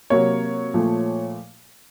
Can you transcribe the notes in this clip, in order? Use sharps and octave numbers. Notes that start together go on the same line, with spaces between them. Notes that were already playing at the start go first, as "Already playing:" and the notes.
C3 F#3 A#3 C#5
A#2 F3 A3